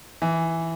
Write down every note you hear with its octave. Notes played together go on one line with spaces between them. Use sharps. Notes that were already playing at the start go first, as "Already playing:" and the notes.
E3